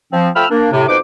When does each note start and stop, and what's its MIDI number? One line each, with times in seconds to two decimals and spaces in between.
0.13 0.30 53
0.13 0.30 60
0.36 0.46 53
0.36 0.46 57
0.36 0.46 79
0.36 0.46 83
0.36 0.46 88
0.36 0.46 89
0.50 0.70 58
0.50 0.70 62
0.72 0.88 45
0.72 0.88 48
0.89 0.98 41
0.89 0.98 47
0.89 0.98 63
0.89 0.98 71
0.89 0.98 72
0.89 0.98 86